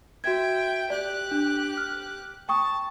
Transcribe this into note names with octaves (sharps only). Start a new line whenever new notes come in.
F#4 E5 G5 G#6
G4 D5 F#6
D4
F6
G5 A5 C#6 D#6